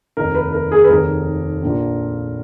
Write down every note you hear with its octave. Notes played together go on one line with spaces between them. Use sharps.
F1 D#2 D#3 A#4
B4
A#4
G#4
B4
F1 D#2 D#3 A#4
A#1 A#2 F3 A#3